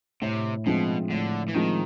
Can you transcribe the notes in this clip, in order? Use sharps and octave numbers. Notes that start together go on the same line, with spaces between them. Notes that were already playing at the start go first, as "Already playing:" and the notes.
A2 C3
B2 F3 G#3 C4
A2 D3
E3
D#3 F3 G#3 C4